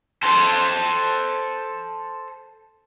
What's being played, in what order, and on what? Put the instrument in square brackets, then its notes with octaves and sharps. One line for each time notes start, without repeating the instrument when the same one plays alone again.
[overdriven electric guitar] A4 C5